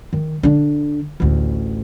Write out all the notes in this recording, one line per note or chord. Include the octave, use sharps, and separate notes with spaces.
D#3
D3 D4
A1 D2